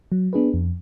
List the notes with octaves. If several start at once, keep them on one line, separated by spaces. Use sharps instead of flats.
F#3
B3 D4 G#4 B4
F2